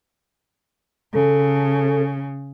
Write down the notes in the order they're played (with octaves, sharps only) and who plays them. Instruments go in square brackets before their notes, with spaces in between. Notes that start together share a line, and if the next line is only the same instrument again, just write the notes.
[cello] C#3 [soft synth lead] A4